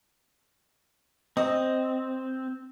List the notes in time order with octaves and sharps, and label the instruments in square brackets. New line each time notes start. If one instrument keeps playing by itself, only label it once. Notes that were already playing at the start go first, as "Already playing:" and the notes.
[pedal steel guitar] C4 [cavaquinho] D#5